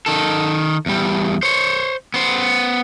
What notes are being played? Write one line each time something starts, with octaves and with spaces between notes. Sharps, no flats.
D#3 A4
E2 G3
C5 C#5
B3 C5